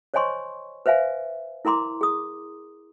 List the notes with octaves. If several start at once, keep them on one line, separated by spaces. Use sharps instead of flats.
C5 C#5 D#5 G#5 C6 C#6
B4 C5 E5 F5 G#5
E4 A#4 A#5 C6 D6
G#4 D#6